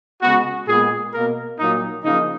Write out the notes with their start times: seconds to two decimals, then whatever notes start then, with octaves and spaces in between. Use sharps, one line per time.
0.22 C#3 G#3 B3 F#4
0.67 A#2 G#3 B3 G#4
1.13 B2 A#3 A#4
1.59 A#2 F#3 A#3 D#4
2.03 C#3 F3 A#3 D#4